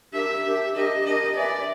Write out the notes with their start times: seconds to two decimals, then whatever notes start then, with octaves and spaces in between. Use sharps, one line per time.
0.13 D4 G4 A#4 E5
0.44 D4 G4 A#4
0.75 D4 G4 A#4 D#5
1.05 D4 G4 A#4 D#5
1.36 B4 D5 E5 G#5